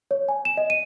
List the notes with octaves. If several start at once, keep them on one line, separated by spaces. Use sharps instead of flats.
C#5
G#5
E7
D#5
D#7